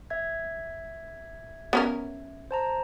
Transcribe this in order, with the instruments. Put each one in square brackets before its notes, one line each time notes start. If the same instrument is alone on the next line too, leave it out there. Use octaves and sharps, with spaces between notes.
[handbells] E5 G#6
[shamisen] B3 C#4 A#4
[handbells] C5 A5 A#5